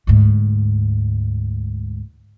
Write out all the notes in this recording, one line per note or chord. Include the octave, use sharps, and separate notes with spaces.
D2 G#2